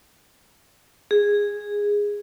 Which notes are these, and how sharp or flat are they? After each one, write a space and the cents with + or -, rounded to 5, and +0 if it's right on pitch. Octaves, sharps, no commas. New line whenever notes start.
G#4 -10